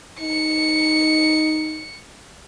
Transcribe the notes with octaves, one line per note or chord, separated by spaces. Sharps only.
D#4 C#7